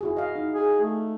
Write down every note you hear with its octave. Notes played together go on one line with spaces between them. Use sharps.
E4 F#4 G#4
D#5 F5
D#4
G#4
A3